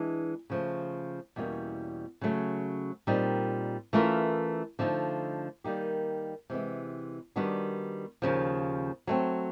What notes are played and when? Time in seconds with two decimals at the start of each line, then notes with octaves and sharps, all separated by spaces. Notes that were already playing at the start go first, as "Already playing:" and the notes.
Already playing: E3 G#3 B3 D4
0.50 C#3 F3 A3
1.36 E2 B2 G3 A#3 C#4
2.21 C#3 F#3 A3 C#4
3.07 A#2 G3 C4 D#4
3.93 E3 A3 C#4 F4 A#4
4.79 D3 F3 A3 C4 D#4
5.64 D#3 G3 A#3 D#4 G4
6.50 C3 E3 G#3 B3
7.36 D#3 G3 B3 D4 F#4
8.22 D#2 C#3 F3
9.07 F#3 A3 C4